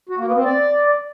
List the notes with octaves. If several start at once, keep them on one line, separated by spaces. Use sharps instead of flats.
F#4
A#3
B3
C4
D5